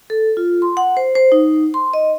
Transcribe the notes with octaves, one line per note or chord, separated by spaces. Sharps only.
A4
F4
C6
F#5
C5
C5
D#4
C6
D#5